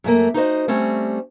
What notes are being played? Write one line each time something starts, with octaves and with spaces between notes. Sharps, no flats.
F#2 A3 A#3
D#4 F#4 C5 D#5
G3 A3 C4 C#4